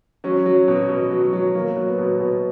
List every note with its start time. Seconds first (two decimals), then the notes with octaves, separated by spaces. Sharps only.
0.24 F#3 C#4
0.46 F#3
0.68 B2
0.89 B2
1.11 F#3
1.33 F#3
1.55 F#3 A#3
1.76 F#3
1.88 B3
1.98 B2
2.20 B2 B3